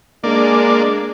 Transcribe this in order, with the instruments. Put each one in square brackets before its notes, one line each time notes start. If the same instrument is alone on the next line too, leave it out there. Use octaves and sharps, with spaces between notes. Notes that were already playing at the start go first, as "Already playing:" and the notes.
[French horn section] G#3 D4 [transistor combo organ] A#3 D5